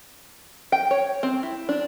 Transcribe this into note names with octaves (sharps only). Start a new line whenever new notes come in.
G5
C#5
C4
E4
D4